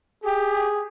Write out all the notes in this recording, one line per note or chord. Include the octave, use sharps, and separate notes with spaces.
G4 G#4